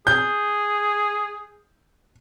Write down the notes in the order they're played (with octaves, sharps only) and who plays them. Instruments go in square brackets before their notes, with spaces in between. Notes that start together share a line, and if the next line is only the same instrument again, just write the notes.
[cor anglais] G#4 [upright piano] G6